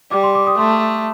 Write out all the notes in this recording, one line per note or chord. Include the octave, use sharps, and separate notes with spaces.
G3 D6
C6
D6
D#6
A3 C6